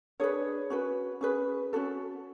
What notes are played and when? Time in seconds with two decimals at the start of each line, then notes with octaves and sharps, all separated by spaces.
0.20 D4 G#4 B4 C#5
0.70 C#4 F#4 B4
1.21 C#4 G#4 B4
1.73 C#4 F#4 A4